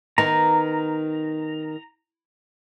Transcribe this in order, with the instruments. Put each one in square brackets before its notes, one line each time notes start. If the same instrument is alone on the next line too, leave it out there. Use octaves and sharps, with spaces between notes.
[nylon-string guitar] D#3 B3 D#4 [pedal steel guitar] A#5